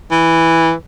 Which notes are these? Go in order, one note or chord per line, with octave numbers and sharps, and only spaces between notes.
E3